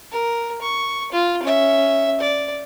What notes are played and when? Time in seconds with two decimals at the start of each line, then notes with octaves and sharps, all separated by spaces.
0.11 A#4
0.62 C#6
1.12 F4
1.42 C#4 E5
2.20 D5